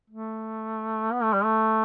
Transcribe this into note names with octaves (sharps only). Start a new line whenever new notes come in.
A3
B3
A3
G3
A3